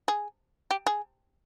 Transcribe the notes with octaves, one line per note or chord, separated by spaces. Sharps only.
G#4
G4
G#4